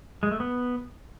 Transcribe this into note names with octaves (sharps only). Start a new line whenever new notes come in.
G#3
A3
B3